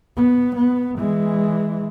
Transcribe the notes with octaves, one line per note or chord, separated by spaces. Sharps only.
B3
B3
E3 G#3